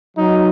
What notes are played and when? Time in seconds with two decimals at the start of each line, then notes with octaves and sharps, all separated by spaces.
0.17 F#3 D#4